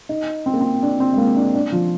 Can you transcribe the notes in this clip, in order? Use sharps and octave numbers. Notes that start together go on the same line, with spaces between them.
D#4
C4
A#3
C4
D4
C4
G#3
A#3
D4
D4
F3